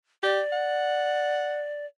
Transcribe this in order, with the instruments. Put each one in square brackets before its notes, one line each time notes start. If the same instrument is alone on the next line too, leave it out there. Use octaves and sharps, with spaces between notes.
[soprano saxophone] G4 [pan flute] D5
[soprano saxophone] F#5